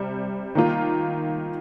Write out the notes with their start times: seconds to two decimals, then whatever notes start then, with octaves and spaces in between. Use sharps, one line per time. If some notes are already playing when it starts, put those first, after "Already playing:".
Already playing: C3 G3
0.55 D#3 A#3 F4